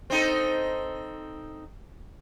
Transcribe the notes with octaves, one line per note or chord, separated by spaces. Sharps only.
C4 D#4 A4